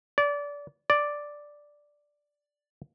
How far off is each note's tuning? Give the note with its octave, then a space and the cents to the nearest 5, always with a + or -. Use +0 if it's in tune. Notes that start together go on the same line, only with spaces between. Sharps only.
D5 -25
D5 +0